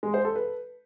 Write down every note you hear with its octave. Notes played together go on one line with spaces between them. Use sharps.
G#3
C5
A4
B4